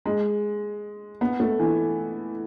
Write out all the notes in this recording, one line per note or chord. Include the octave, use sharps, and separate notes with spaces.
G#3
B3
A3
E3